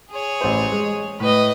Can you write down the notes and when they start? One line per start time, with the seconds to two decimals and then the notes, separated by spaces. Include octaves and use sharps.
0.11 G#4 C#5
0.41 A1 C5
0.72 G#3
1.20 A2 B4 D#5